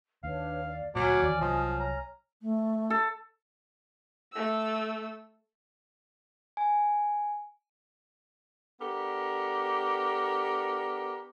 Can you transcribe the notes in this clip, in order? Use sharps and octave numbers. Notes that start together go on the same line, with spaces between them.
D#2 D4 B4 C#5 F5
D5
D2 A#2 F#3 C#5 G#5 D6 F6
D#2 E3 D5
C2 F3 F#3 D#5
A#5
A3
A4
A3 E6
G#5
B3 D4 G4 A4 A#4